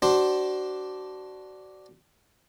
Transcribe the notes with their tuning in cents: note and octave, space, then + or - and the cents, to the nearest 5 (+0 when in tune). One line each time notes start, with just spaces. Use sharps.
D4 +0 F#4 +30 C5 +0